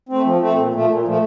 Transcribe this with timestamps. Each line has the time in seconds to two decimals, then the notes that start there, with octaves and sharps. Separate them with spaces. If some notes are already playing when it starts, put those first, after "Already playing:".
0.09 A3 C4
0.24 F3
0.40 A3 C4
0.56 A#2
0.73 F3 A3
0.88 A#2
1.05 F3 A3